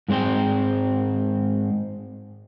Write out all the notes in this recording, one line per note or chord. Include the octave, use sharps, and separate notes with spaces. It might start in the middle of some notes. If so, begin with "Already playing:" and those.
G#2 G#3 C4 C5 G5